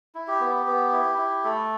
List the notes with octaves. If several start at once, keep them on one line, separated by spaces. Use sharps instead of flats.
E4
G4
B3
B3
E4
E4
A3 A4